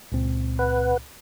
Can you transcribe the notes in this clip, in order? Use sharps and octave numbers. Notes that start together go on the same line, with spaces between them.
C#2 A#2 C4
B4 F#5